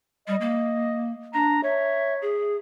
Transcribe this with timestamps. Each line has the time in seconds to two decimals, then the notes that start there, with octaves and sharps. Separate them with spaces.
0.28 G3 D#5
0.41 A#3
1.34 D4 A#5
1.63 C#5 E5
2.22 G#4